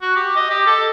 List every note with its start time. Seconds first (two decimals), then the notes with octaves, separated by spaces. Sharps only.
0.02 F#4
0.16 G4
0.36 D#5
0.50 G4
0.67 A4